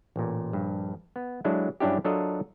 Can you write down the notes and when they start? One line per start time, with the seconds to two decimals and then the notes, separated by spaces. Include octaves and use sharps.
0.16 A1 A#2
0.53 A#1 G2
1.16 B3
1.44 F#3 G#3 D4 E4 A4
1.80 G2 F#3 C#4 D4 E4 G4
2.05 F#3 D4 F4 A4 A#4 D#5